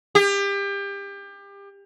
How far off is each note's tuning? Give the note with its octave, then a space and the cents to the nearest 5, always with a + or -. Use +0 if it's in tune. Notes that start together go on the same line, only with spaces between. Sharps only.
G4 +30